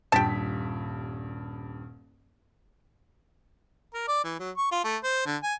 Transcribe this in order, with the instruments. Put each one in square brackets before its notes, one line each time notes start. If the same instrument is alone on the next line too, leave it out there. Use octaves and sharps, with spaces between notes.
[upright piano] D#1 G2 B6 [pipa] G5 A5
[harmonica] A#4
D5
E3
F#3
C#6
F4
A3
C5
D3
G#5